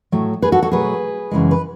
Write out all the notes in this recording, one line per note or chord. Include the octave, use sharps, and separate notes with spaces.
A2 F#3 A3
G#4 B4
F#4 A4
F#4 A4
B2 F#3 A3 G#4 B4
F#2 C#3 E3 G#3
B4